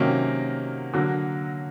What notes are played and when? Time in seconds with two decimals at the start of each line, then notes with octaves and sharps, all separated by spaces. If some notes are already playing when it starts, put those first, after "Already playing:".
Already playing: C3 D#3 F#3 A#3 C#4
0.94 D3 F#3 A#3